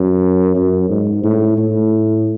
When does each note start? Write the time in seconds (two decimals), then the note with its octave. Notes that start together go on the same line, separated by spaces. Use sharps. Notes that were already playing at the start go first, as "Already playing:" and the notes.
Already playing: F#2
0.55 F#2
0.89 G#2
1.23 A2
1.57 A2